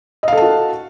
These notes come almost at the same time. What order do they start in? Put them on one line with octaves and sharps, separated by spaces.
D#5 F5 A4 A5 F#4